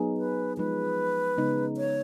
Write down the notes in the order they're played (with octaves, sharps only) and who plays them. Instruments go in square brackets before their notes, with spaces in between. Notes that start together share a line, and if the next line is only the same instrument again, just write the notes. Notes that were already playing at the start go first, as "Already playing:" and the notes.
Already playing: [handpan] F#3 B3 D#4 G#4
[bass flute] B4
[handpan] F3 G#3 D#4 [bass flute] B4
[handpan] C#3 G#3 B3 D#4
[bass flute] C#5